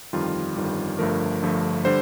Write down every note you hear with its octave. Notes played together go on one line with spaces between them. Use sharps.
G1 F2 D#3 G3 F4
G1 F2 D#3 G3
G1 G2 F3 A3 A#4
G1 G2 F3 A3
D3 G3 C5